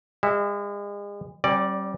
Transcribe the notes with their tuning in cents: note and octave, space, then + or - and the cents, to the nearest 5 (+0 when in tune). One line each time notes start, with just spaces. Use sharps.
G#3 -40 E5 +0
G3 -25 C#4 -45 D5 +0